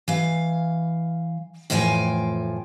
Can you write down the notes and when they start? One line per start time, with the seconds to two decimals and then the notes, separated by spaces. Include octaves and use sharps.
0.08 E3 F5
1.70 F2 A2 E3 F4 G5 G#5